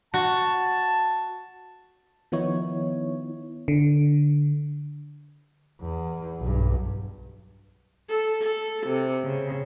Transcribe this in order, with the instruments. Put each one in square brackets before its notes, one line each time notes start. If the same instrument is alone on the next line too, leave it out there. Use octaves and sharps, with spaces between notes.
[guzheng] F#4 [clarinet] A5
[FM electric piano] D#3 F3 B3 D#4 E4 C#5
D3
[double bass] E2
B1 G2
[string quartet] A4
A4
C3
C#3